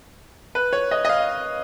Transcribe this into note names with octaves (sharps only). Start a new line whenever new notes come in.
B4
C#5
D#5
D#5
F5